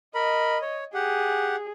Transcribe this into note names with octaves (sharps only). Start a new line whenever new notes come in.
A#4 D#5 B5
C#5
G4 G#4 F#5